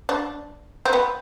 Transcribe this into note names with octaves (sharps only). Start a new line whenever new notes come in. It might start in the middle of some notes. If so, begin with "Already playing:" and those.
D4
C4
B3